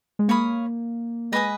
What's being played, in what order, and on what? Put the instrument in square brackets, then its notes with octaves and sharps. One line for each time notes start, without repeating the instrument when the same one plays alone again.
[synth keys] G#3
[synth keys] A#3 [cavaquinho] C#5 F5 B5 D#6
[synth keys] G#3 [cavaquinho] B4 D#5 G#5 D#6